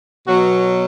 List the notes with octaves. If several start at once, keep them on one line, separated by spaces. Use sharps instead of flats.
B2 F#3 F#4